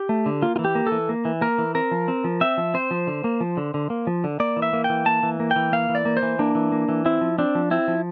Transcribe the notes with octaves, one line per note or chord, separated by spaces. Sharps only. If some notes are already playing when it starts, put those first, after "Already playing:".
Already playing: G4
A3
D3
A#3 F4
F4
E3
G4
A#3
A4
E3
A#3
E3
A#3 A#4
E3
C4 A#4
F3
C4
F3
C4 E5
F3
C4 C5
F3
D3
A#3
F3
D3
D3
A#3
F3
D3
A#3 D5
E3
E5
A#3
G5
E3
A#3 A5
E3
A#3
G5
E3
A#3 F5
E3
D5
A#3
C5
E3
A#3 D4
E3
A#3
E3
C4 E4
F3
C4 D4
F3
C4 E4
F3